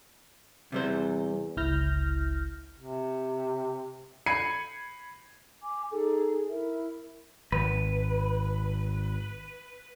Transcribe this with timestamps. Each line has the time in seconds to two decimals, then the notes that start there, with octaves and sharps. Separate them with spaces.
0.72 E2 C3 G3 C5
1.57 G1 C#2 E4 F6 G6 A#6
2.80 C3
4.26 B5 G#6 C7 C#7 D#7
5.62 G#5 D6
5.91 D#4 G#4 A4
6.49 E4 A#4 E5
7.52 G#1 B4